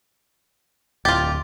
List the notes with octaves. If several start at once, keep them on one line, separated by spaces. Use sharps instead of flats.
D1 F4 G4 A6